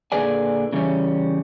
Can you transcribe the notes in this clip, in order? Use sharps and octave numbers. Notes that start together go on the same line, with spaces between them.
A#2 D3 G#4 B4 D5 G#5
C#3 E3 F3 G3 C#4